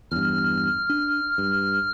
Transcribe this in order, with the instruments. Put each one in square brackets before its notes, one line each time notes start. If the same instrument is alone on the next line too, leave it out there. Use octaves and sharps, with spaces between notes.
[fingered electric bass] E2 G2 [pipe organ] F6
[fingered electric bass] D4
G2